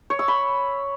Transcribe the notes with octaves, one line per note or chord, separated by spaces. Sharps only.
C#5
E6
B5